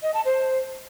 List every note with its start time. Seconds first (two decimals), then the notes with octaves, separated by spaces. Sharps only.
0.03 D#5
0.14 A5
0.25 C5